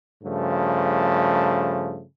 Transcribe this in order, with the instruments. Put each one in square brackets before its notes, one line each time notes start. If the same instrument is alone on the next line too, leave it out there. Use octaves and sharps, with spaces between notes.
[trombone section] G2 C#3 F3 A3